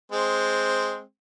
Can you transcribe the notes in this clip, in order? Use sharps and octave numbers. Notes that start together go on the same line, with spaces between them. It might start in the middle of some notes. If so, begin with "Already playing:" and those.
G#3 C4